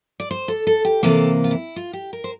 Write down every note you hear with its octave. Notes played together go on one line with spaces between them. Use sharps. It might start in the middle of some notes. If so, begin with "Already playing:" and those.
D5
C5
A4
A4
G4
C3 E3 A#3 A4
F4
E4
F4
G4
A#4
C5